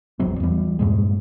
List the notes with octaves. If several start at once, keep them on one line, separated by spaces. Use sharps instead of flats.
F1 A#1 F#3 C4
E2 G3
G2 A#2 G#3